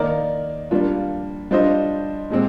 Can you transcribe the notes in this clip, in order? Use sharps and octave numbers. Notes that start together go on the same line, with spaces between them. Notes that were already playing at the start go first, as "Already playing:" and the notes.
Already playing: D#3 A#3 D#4 A#4 D5
G3 A#3 D4 F4
G3 D4 F4 C5 D#5
A#2 G#3 C4